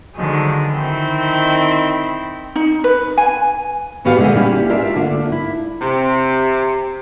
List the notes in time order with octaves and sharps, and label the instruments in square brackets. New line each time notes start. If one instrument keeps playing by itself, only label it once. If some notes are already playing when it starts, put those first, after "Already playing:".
[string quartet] D3 D#3 F3 F#3 G#3
D#3 C4 E4
[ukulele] D#4
B4
G#5
[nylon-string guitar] A2 D#3 B3 F#4 G4 F5
A#2 D3 G#3 E5
G3 A#3 C#4 E4 G4
D4 F4 A#4 D5 E5
D3 A3 A#3 D4 F4
E4
[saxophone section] C3